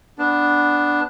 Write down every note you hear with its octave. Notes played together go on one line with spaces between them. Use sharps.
B3 D4